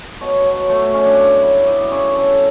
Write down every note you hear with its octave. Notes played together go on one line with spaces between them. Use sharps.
B2 C#5
F#3
A3 C#5
F#4
B2 C#4
D4
C#3
F#3 E4
B3 D5
C#3 C#5
C#3 A4